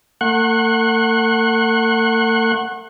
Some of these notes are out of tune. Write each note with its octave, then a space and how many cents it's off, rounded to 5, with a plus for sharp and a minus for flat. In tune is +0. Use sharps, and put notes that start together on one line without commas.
A3 +45 F#5 +0 C#6 -45